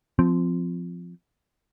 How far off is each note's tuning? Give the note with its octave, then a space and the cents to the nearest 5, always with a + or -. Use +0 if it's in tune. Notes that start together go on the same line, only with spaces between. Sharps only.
F3 +0 C4 -15